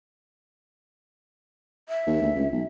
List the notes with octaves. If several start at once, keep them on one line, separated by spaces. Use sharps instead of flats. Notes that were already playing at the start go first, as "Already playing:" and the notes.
E5
D#2
D2
C#2
B1